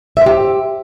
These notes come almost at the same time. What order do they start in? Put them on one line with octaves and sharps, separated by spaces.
E5 C5 G4